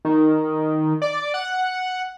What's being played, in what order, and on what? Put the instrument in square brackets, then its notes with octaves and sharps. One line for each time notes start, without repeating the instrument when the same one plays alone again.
[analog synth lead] D#3
D5
F#5